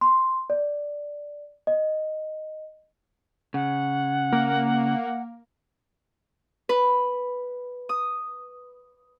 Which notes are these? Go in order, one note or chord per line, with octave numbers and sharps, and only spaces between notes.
C6
D5
D#5
C#3 F#5
A#3
B4
D#6